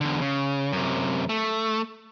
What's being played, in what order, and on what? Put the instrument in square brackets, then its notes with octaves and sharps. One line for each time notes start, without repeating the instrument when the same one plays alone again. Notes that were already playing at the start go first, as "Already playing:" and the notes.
[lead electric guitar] E2 D3
C#3
F#2 C3
A3